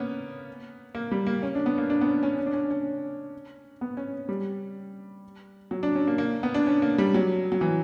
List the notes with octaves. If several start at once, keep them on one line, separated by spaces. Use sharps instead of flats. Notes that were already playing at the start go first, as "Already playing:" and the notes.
Already playing: A#3 B3 C#4
A#3
G3
A#3
C#4
D4
B3
A#3
D4
B3
C#4
C#4
C#4
D4
C#4
C#4
B3
C#4
G3
F#3
D4
C#4
A#3
A#3
B3
D4
C#4
A#3
G3
F#3
F#3
E3